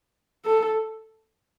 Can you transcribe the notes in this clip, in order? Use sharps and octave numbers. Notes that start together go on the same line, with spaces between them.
A4